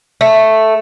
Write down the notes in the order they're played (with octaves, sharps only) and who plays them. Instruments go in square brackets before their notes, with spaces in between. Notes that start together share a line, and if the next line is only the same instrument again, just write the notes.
[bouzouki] A3